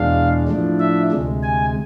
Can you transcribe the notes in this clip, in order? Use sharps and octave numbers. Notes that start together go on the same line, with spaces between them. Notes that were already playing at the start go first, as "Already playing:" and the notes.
Already playing: E2 B2 G#3 D4 F5
A2 F3 A3 D4
E5
D2 C3 G#3
G#5